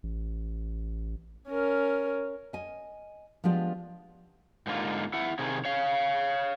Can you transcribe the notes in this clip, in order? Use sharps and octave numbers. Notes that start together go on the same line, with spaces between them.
A1
C#4 A#4
D#5 G#5
F3 G#3 B3 D4 F4 G4
G#2 D3 A#3 F4
E4 F#5
C3 D#3 G#4
C#5 F5